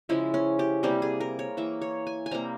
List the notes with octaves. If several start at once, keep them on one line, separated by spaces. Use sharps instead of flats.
C#3 F3 G#3 E4
C#4
G4
C3 G3 A#3 G4
G#4
A#4
C#5
E3 A#3 E5
C#5
G#5
G#5
C3 G3 A#3 A#5